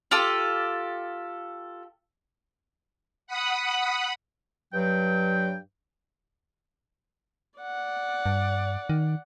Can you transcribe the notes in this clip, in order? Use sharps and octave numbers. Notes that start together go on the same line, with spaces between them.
F4 G4 A4
F#5 B5 D#6
G2 F#3 G5
D5 F#5
G2
D#3